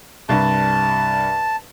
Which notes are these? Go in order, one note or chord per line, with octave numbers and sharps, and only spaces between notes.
C2 G2 A5